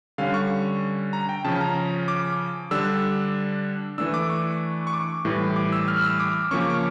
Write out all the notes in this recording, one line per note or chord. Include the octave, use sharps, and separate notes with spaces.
D3 G3 C#4 F5
C#6
A#5
G5
C#3 F3 C#4 A5
A#5
D6
D3 G3 D4 E6
E3 A3 D4 E6
D6
C#6
C#6
D6
A2 E3 G3
D6
E6
F6
E6
D6
C#3 F3 A#3 C#4 C#6
D6
C#6